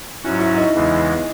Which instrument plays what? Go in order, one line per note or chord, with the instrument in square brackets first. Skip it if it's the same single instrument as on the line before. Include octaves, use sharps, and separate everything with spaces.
[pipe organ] G#2 F#3 C#4 F#4 [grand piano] E4
[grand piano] E4
D#4
[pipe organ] E2 C#3 E3 G#3